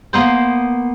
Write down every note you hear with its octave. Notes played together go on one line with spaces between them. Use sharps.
A#3 B3 C5